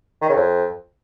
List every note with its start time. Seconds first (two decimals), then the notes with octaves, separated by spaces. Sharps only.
0.22 D#3
0.29 C#3
0.36 F2